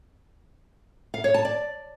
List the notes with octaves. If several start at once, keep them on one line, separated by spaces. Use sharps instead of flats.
F5
C#5
A5
D5